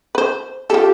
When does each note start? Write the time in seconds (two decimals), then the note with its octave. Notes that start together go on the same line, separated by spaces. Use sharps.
0.15 B4 C5
0.70 F4 G4 A4